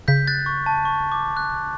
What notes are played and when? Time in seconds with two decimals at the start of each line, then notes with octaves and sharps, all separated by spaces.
0.08 C#3 G6 B6
0.27 F#6 A6
0.46 C#6
0.66 A5
0.85 C#6
1.12 D6
1.37 F#6